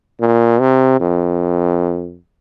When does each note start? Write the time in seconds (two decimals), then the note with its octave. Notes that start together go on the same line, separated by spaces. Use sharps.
0.21 A#2
0.60 C3
1.00 F2